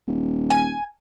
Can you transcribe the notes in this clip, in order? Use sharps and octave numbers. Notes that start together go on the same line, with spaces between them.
D#1
G#5